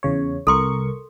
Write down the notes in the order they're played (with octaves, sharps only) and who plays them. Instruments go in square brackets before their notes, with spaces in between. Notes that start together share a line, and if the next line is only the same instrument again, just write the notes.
[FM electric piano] E2 C#3 C#5
[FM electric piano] C2 A#4 C#6 [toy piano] A4 C6